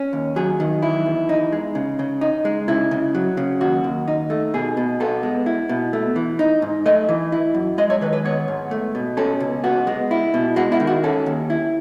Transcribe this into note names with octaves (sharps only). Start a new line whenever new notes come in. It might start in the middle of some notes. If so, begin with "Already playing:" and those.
Already playing: C#4
D#2
F#3 G#4
D#3
E2 E4
E2
D#4
G#3
C#3
C#3
D#4
G#3
C#3 E4
C#3
F#3
C#3
D#2 F#4
D#2
D#4
A3
B2 G#4
B2
B3 A4
G#3
E4
B2
A3
E3
D#4
G#2
A3 D#5
E3
E4
F#2
G#3 D#5
C#5
D#3 B4
B4
B3 C#5
G#2
A3
B2
C#4 A4
C#2
B3 F#4
G#3
E4
B2
G#3 F#4
E4
D#3
F#4
C#4 A4
D#2
E4